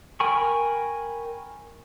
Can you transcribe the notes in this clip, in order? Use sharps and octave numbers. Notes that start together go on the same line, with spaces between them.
A#4 G5 G#5 B5 C#6